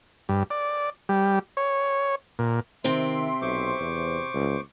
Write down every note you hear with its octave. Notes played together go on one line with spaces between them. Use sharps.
G2
D5
G3
C#5
A#2
C3 D#3 C4 E5 C6
B1 C5 C#6 D6
E2
C#2